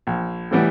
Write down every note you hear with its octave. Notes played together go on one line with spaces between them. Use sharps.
A#1
A2 E3 G3 B3